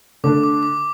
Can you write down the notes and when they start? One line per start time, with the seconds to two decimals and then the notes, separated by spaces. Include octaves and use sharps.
0.24 D3 A3 D4 D6
0.43 D6
0.63 D6